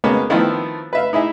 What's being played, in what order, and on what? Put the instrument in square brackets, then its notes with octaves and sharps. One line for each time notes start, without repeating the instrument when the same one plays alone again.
[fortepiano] G#3 A#3 B3 C#4
D#3 F3 A3 B3 C4 E4
B4 E5 F5
D#4 E4 G#4 E5